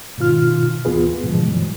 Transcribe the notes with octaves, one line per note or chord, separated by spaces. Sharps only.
G#2 B2 D#3 F4 F6
D2 E3 B3 F4 G#4 B4
G#2 B2 D3 E3 F3 G#3
G2 E3 F#3